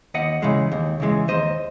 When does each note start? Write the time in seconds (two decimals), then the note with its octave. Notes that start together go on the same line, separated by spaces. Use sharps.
0.14 D#2 D#5 F#5
0.42 C#3 E3 G#3
0.72 D#2
1.00 C#3 E3 G#3
1.28 D#2 C5 D#5